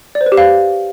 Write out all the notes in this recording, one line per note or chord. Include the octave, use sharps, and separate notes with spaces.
D5
C5
B4
G4
F5